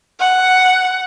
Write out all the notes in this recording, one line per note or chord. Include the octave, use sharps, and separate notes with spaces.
F#5